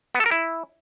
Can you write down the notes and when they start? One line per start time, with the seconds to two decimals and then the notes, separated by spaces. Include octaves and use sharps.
0.15 B3
0.20 A4
0.26 A#4
0.31 E4